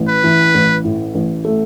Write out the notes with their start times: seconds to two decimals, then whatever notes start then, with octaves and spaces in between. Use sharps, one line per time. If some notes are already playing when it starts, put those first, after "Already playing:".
Already playing: A1
0.09 B4
0.24 E3
0.54 A1
0.84 A2
1.15 A1
1.45 A3